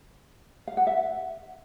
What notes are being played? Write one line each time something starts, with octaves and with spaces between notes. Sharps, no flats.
F5
F#5
E5